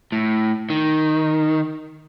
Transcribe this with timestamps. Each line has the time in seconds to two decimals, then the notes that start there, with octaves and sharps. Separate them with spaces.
0.12 A2
0.70 D#3